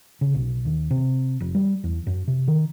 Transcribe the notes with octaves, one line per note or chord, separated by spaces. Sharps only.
C#3
B1
D#2
C3
F1
G3
E2
F#2
C3
D#3